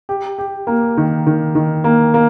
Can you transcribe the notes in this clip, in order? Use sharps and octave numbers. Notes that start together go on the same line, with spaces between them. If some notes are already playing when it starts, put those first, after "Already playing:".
G4
G4
A#3
D#3
D#3
D#3
A#3
A#3